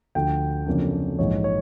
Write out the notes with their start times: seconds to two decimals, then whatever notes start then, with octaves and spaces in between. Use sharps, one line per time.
0.15 D2 D3 F3 G5
0.66 F2 C#3 F#3 A#3 D4
1.19 A#1 G#2 E3 G#3 C#5
1.44 C#5